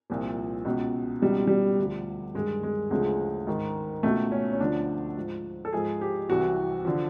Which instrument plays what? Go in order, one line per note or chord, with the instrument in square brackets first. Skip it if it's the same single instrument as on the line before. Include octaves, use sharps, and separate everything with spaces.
[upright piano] C2 A#2 F3
C#2 B2
C#2 B2 G3
G3
D2 D3 F3
G2 D#3 G#3
G#3
D2 C#3 F3 G#3
G#2 D#3
C#2 B2 A3
C#4
C#4
D2 D3 F3 D4
G#2 F3
A4
G#2 F3 G#4
G4
C2 C3 E3 F#4
D3 F3